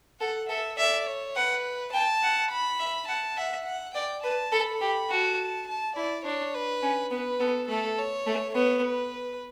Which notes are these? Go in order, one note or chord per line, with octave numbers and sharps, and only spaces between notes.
A4 F#5
A4 E5
D5 E5
C#5
B4 F#5
G5 A5
F#5
B5
E5
F#5 A5
E5 F#5
F#5
D5 G5
B4 A5
A4 B5
G4 B5
F#4 A5
A5
E4 D5
D4 C#5
B4
C#4
B3 B4
B3 A4
A3 A4
C#5
A3
B3 C#5
B4